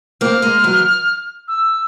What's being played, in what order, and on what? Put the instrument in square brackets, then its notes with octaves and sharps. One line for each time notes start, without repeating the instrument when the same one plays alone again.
[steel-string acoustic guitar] A#3 C4 [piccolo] F6
[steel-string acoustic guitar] G#3 A#3
E3 F#3
[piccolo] E6